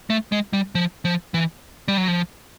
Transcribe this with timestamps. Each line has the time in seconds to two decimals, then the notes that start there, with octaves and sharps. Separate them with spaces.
0.10 A3
0.32 G#3
0.53 G3
0.75 F3
1.05 F3
1.34 E3
1.88 G3
1.97 F#3
2.08 F3